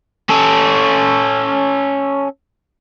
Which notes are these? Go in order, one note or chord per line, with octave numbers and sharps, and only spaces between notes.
C#4 A4